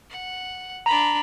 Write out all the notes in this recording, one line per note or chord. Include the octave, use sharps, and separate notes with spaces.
F#5
D4 A#5 B5